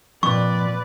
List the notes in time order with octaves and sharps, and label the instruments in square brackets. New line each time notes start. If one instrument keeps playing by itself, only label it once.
[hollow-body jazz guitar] F2 [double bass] A#2 [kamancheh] B4 D5 [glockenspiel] C#6